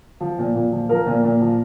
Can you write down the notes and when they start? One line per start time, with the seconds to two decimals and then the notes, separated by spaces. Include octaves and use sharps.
0.21 F3
0.38 A#2
0.55 A#2
0.72 F3
0.89 F3 A#4
1.06 A#2
1.24 A#2
1.41 F3